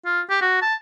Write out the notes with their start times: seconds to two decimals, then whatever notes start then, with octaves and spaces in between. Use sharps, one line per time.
0.06 F4
0.30 G4
0.41 F#4
0.62 A5